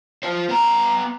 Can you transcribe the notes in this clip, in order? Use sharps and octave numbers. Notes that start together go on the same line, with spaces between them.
F4 C5
B3 A#5